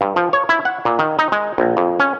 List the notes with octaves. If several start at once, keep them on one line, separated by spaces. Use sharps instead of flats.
G2
F3
C#5
E4
F#5
A#2
D#3
D#4
G#3
A#1
F2
C#4